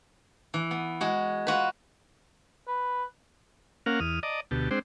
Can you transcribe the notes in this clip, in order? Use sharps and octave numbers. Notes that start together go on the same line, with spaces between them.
E3
B3
G#3 F#4
F4 F#4 B4
B4
A#3 C#4 A#4 F5 F#5
E2 D#6 F6
D5 D#5 A5 A#5
D2 B2 G4 A5
G#3 C4 D4 C5 G5